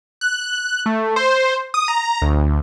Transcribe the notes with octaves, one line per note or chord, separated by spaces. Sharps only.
F#6
A3
C5
D#6
A#5
D2